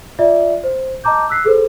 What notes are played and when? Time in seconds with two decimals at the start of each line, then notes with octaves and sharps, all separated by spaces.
0.19 F4 D5 E5
0.64 C5
1.04 D#5 A5 A#5 D6 G6
1.30 E6 F#6 B6 C7
1.44 G#4 A4 B4 C5